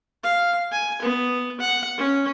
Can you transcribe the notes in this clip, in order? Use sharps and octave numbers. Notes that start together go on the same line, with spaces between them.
F5
G#5
B3
F#5
C#4